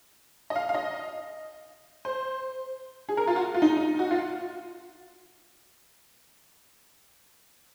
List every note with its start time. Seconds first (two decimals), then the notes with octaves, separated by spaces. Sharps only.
0.50 D#5
0.56 F5
0.69 F5
0.74 D#5
2.05 C5
3.09 G#4
3.17 A#4
3.27 F4
3.36 F#4
3.54 F4
3.62 D#4
3.77 D#4
3.99 F#4
4.11 F4